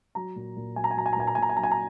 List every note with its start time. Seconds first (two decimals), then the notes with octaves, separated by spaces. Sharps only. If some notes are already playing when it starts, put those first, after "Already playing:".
0.15 F#3 A#5
0.36 A#2
0.56 A#2
0.76 F#3 G#5
0.84 A#5
0.91 G#5
0.97 F#3 A#5
1.06 G#5
1.13 A#5
1.16 A#2 G#5
1.27 A#5
1.35 A#2 G#5
1.43 A#5
1.49 G#5
1.57 F#3 A#5
1.63 G#5
1.71 A#5